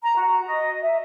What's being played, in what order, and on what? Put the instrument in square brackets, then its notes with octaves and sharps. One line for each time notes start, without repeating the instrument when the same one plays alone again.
[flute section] A#5
F#4
D#5
E5